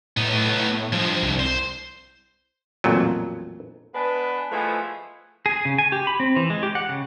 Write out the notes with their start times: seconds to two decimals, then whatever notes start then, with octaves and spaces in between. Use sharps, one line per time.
0.17 A2 B3 D#4
0.92 G2 F3 G#3
1.22 C2
1.40 C5
2.84 A1 F2 A#2 F#3
3.94 G#3 B3 D4 B4
4.51 E3 F3 G#3 A3 B3
5.46 G#4
5.65 C#3
5.78 G#5
5.92 G4
6.07 B5
6.20 C4
6.36 E3
6.50 G#3
6.63 G4
6.75 F#5
6.89 C#3